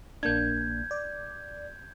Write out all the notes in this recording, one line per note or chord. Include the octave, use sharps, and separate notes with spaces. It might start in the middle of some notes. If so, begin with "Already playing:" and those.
A#1 A#3 D4 G6 G#6
D5